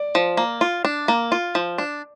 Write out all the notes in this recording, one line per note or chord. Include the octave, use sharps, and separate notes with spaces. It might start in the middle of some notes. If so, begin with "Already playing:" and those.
Already playing: D5
F3
A#3
F4
D4
A#3
F4
F3
D4